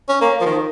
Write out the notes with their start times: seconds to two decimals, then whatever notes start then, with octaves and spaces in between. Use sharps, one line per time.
0.09 C#4
0.21 A#3
0.41 F3
0.46 D#3